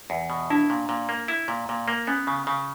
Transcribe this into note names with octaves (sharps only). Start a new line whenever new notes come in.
E2
B2
D4 E4
A#2
A#2
A#3
E4
A#2
A#2
A#3
B3 C#4
C#3
C#3